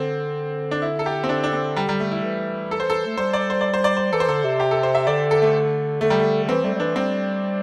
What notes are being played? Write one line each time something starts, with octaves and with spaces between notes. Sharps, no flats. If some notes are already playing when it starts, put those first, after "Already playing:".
Already playing: D3 C4
D4
E4
A4
G4
C4
D3 D4
D4
C4
G3
G3
A3
E4
E3
A4
C5
A4
A3
G3 C5
D5
C5
D5
C5
D5
C5
E3 A4
C5
D3 A4
C3
G4
A4
C5
E5
D3 D5
A4
A3
D3 A3
G3
A3
D3
E3 C4
G3 A3
G3
E3 D4
G3 C4